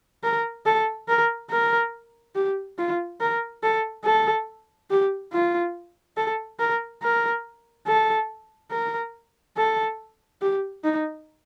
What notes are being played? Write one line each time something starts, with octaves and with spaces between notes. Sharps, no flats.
A#4
A4
A#4
A#4
G4
F4
A#4
A4
A4
G4
F4
A4
A#4
A#4
A4
A#4
A4
G4
D#4